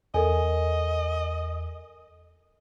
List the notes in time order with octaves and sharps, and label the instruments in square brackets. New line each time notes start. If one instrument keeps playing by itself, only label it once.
[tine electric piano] E2 [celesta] A4 A#4 G#5 [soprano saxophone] D#5